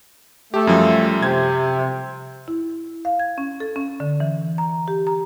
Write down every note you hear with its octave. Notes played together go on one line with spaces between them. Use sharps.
A3 G4
F#2 F3 G3
C3 G#6
E4
F5
G#6
C#4
A4
C#4
D3
E3
A#5
G4
A#5